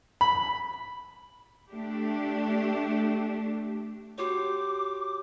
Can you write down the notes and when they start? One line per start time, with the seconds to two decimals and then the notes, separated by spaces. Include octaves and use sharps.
0.21 B5
1.71 A3 D4 G4
4.18 F#4 G4 C#5 D6